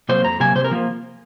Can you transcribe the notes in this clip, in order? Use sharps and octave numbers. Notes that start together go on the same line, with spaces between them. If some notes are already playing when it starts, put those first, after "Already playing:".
C3 F#3 A#3 C5
F2 A#5
C3 F#3 A#3 G#5
C3 C5
A#4
F3 A#3